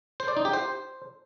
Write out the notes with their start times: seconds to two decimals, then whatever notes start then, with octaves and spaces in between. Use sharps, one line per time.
0.20 C5
0.28 D5
0.37 D#4
0.45 G4
0.53 C5